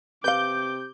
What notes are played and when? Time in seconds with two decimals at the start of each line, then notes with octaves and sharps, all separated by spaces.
0.24 C3 B4 F5 D6 G6